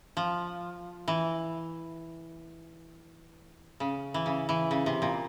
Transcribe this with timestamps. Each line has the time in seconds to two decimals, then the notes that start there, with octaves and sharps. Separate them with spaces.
0.17 F3
1.08 E3
3.80 C#3
4.14 E3
4.26 C#3
4.49 E3
4.71 C#3
4.86 C3
5.02 A#2